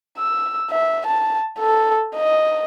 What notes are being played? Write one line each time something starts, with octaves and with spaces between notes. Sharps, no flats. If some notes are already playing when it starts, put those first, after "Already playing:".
E6
E5
A5
A4
D#5